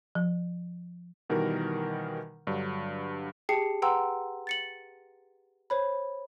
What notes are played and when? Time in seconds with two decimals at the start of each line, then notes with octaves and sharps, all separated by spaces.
0.15 F3
1.29 B2 D#3 E3 G3 A#4
2.47 G2 D3 F#3
3.49 G4 G#4 G5 A5 C7 C#7
3.82 B4 F#5 G5 A#5 C6 E6
4.47 A6 C#7 F#7
5.70 C5 C#5 B5